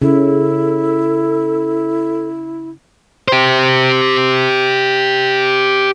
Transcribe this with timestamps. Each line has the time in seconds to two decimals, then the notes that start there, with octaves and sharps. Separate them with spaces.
0.02 C#3 E4 A4
3.28 G4 C5